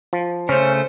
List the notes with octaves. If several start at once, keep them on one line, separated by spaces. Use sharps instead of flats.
F3
C#3 A3 C#4 C5